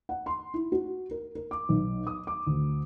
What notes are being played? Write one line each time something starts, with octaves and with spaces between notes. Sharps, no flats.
F#5
C6
E4
F#4
A#4
A#4
D6
B1
D#6
D6
D2